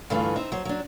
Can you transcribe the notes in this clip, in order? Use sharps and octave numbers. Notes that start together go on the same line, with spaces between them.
G2 D3 E3 A3 F4 G#4
C4 D#4 E5
F#3 C5
F#3 D4